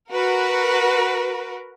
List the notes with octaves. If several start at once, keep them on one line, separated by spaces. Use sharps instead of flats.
F#4 A#4 B4